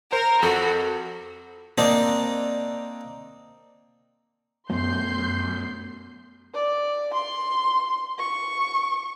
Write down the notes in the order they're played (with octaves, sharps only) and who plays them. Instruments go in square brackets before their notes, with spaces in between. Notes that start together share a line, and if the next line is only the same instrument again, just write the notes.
[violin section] A#4 [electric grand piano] C5
[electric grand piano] F2 [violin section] F#4 [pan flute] A4
[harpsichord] A#3 C4 D4 D#4
[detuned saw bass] F#2 [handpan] A3 B3 [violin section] C6 G6 C7
[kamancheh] D5
C6
C#6